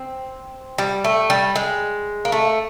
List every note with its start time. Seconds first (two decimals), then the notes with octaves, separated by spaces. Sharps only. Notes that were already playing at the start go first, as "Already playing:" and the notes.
Already playing: C4
0.78 G3
1.04 A3
1.30 G3
1.55 G#3
2.25 A#3
2.32 A3